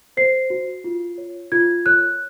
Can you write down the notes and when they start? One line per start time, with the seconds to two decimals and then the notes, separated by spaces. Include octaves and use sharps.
0.17 C5 C7
0.50 F#4
0.84 F4
1.18 C#5
1.52 F4 G#6
1.86 C#5 F#6